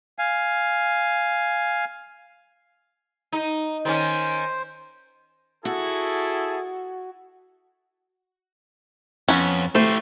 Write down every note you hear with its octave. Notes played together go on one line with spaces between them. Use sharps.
F5 G#5
D#4
D#3 C#4 C5
E4 F#4 G#4 A4
F2 B3 C#4
A3 E4 G4 C5